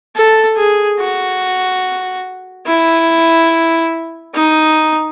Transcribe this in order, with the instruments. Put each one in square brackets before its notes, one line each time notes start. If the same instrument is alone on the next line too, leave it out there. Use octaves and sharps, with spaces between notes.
[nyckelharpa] A4
G#4
F#4
E4
D#4